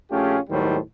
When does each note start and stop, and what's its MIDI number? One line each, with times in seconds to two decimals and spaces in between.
0.11 0.38 34
0.11 0.38 57
0.11 0.38 61
0.11 0.38 65
0.11 0.38 67
0.11 0.38 68
0.50 0.77 39
0.50 0.77 45
0.50 0.77 51
0.50 0.77 54
0.50 0.77 55
0.50 0.77 72